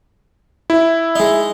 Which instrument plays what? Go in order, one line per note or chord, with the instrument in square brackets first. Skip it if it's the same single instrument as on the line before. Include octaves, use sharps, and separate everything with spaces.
[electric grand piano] E4
[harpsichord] G#3 D#4